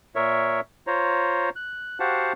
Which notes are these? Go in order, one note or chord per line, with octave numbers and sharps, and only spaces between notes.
A#2 A#4 C#5 E5
F4 C5 C#5 A#5
F#6
F#4 G4 C5 F5 F#5 A5